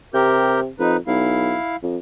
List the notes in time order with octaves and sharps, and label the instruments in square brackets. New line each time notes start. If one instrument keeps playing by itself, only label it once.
[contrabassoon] C3 [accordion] G4 A#4 G6
[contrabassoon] F2 [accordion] D#4 B4
[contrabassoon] B1 [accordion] E4 F5
[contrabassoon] F2